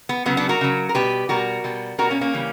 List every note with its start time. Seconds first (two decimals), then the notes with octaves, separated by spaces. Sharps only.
0.09 B3
0.26 C#3 F#3 B3
0.37 B3 D4
0.49 F#4 A#4
0.61 C#3 F#3
0.89 A#4
0.95 B2 G3 G4 B4
1.29 B2 G3 F#4 A#4
1.64 B2 G3
1.98 B2 G3 F#4 A#4
2.10 A#3 C#4
2.21 A#3 C#4
2.33 C#3 E3 G3